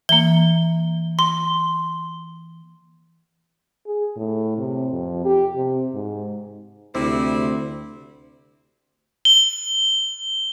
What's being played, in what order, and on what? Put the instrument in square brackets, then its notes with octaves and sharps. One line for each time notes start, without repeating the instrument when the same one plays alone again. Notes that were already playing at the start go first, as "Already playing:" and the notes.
[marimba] E3 A#3 [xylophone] G7
[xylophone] C6
[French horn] G#4
A2
C3
F2
G4
C3
G#2
[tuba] D2 [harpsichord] C3 [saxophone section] G3 C4 E4
[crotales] G7